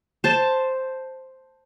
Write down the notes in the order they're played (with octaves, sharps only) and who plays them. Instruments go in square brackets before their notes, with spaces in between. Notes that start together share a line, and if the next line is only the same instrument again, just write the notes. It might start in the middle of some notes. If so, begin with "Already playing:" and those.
[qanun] C5 A5